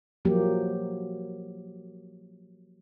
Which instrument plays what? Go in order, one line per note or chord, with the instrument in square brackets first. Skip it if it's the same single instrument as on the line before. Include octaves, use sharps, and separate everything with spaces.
[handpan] F3 F#3 A#3 G4